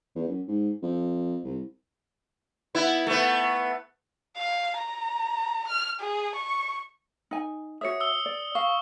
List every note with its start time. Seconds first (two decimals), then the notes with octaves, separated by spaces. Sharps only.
0.16 E2
0.28 F#2
0.48 G#2
0.83 F2
1.44 C2
2.75 B3 E4
3.07 A3 B3
4.37 F5
4.78 A#5
5.67 F6
6.00 G#4
6.35 C#6
7.31 D#4 G#5
7.81 F#4 C#5 E5 D#6 C#7
8.00 D#6 E6 G7
8.26 D5
8.55 F5 C#6